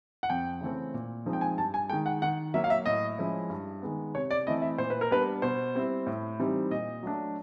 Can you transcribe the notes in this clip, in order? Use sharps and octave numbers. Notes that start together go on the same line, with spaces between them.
F#5
F2 G5
C#3 E3 A3 C4
A#2
F3 G#3 C4 D#4
G5
G#5
G2 A5
G#5
D#3 G#3 G5
F#5
D#3 F#5
F#3 A#3 E5
F5
E5
A2 D#5
F3 G#3 C#4 E4
G2
D#3 G#3 B3
C3 C#5
D5
E3 A3 C4 E4 D#5
E5
A#2 C5
B4
A#4
G3 B3 D4 B4
B2 C5
G3 C4 E4
A2
E3 G3 C4 D#4
A#2 D#5
F#3 A3 D4